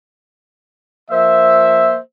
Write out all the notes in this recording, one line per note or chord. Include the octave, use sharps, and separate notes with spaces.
F3 A#3 C5 E5